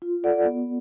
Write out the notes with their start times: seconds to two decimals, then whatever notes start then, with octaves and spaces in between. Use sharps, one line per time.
0.02 F4
0.23 A4 D5 F#5
0.45 B3